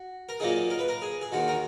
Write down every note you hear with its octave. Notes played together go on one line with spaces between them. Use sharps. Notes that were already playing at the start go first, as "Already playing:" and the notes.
Already playing: F#4
A#4
A#2 F#3 A#3 D#4 G#4
A#4
B4
A#4
G#4
G#4
D#2 D#3 G#3 F#4
A#4